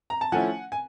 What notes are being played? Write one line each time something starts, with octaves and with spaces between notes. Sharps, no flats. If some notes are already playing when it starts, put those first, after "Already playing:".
A#5
A5
F3 A3 C#4 E4 F#5 G#5
G#5